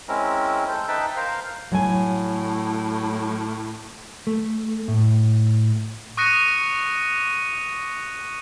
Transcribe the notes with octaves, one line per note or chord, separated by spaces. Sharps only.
G#3 C4 C#4 E4 A#4
A4 C5
D#4 B4 E5 G5 A5
A#4 C5 F5
A2 F#3 G#5
A3
A2
C#6 D#6 F#6 A#6 C#7 D#7